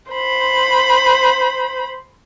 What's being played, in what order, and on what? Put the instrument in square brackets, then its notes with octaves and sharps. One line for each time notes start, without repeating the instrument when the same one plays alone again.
[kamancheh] C5 B5